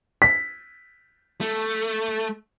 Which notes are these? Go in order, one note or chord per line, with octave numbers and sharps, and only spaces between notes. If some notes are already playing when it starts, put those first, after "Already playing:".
B6
A3